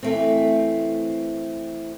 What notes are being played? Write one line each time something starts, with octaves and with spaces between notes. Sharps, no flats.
E3 A3 C4